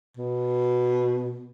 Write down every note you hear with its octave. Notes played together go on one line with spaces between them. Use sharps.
B2